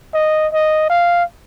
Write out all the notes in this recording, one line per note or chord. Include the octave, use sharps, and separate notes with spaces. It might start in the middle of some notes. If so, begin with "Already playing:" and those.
D#5
D#5
F5